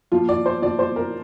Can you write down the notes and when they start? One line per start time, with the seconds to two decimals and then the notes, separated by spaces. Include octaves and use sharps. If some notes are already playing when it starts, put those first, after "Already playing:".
0.12 A#2 F3 F4
0.29 D5
0.46 C5
0.62 A#2 F3 D5
0.79 C5
0.96 A#4